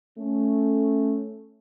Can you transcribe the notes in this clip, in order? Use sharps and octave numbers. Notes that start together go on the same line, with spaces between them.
A3 C#4